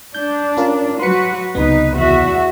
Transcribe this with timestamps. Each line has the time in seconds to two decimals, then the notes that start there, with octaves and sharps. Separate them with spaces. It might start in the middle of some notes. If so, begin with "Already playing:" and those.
0.14 D4 G6
0.57 C#4 F4 A#4
0.99 F#3 F#4 B4 C6 C#7
1.55 C#2 C3 B3 D#4 B4
1.96 E2 F#4 E5